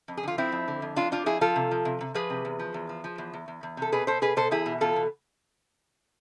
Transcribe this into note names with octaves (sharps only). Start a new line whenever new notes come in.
F2
G#4
D3 F4
F3 C4 E4
F2
D3
F2
F2 D4 F4
F3 D4 F4
F2 E4 G#4
F3 F4 A4
C3
F3
C3
C3
F3 G#4 B4
C3
E2
F3
E2
F3
F3
E2
E2
E2
E2
C3 A4
B2 G#4 B4
B2 A4 C5
B2 G#4 B4
B2 A4 C5
E2 E4 G#4
B2
E2 F4 A4
B2